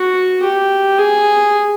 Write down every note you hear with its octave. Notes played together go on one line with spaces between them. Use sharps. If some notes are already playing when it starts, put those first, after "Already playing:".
Already playing: F#4
G4
G#4